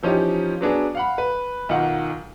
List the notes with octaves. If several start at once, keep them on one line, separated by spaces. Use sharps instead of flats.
E3 F3 C#4 D#4 F4 G4
F#3 B3 D4 G#4
F5 F#5 B5
B4
B1 D#3 D#4 F4 F#5